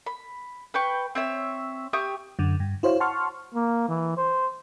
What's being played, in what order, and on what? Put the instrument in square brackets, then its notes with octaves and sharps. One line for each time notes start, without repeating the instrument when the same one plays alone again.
[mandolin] B5
B4 G5 C#6
C4 C#5 E5
G4 E5 C#6 D#6
[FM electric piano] F#2 D3
G2
E4 F#4 C5 C#5 F5
F#5 A5 C6 C#6 F6
[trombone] A#3
E3
C5